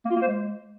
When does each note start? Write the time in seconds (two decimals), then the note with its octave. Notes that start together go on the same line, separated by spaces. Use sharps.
0.05 A#3
0.11 F4
0.16 A#3
0.22 C5
0.27 G#3